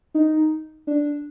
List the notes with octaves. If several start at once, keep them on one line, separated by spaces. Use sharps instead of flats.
D#4
D4